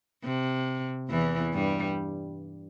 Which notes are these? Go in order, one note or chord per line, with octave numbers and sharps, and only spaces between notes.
C3
E2 E3
G2 G3